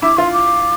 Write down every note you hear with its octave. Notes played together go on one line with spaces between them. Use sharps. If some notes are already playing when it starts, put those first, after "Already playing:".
E4 D6
F4 C6
D6